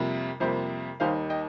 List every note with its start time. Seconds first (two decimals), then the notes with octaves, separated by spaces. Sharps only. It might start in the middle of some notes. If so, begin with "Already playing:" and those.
Already playing: F2 C3 G3 A#3
0.40 F2 C3 G3 A#3 C5
1.00 D#2 D#3 G3 D#4 C5 F5
1.30 D#5 G5